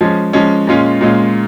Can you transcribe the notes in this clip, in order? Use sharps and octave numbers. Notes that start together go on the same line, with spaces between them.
F3 G#3 C#4
F3 G#3 C#4
A#2 G#3 C#4 F4
A#2 G#3 C#4 F4